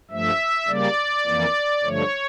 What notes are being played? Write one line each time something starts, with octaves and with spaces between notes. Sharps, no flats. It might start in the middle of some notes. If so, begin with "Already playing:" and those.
G2 F3 A3 E5
C#3 G3 A#3 D5
F2 E3 A#3
G2 D3 F3 A3 C#5